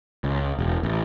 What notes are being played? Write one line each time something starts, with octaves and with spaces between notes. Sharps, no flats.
C#2
E1
A1